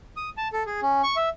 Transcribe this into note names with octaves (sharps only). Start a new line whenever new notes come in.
D#6
A5
A4
G#4
C#4
C#6
E5